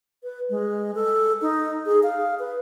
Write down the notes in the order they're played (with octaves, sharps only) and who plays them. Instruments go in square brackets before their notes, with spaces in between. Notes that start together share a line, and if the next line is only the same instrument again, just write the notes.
[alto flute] B4
G#3
A4
D#4
G#4
F5
B4